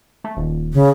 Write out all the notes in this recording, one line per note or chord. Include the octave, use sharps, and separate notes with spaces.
A3
D#1
C#3